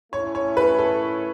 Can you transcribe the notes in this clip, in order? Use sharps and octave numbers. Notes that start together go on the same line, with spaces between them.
A2 A3 C#4 E4 C#5
C#5
B4
A4